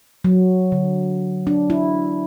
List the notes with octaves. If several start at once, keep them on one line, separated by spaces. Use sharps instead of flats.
F#3
D3
D4
E4